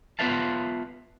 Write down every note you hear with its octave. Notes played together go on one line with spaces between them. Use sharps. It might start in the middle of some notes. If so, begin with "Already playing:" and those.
B3 F4 B4 E5 F5 A5